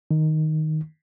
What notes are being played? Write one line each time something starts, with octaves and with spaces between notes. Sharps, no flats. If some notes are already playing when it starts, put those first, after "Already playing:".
D#3